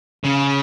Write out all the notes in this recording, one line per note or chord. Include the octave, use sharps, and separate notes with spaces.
C#3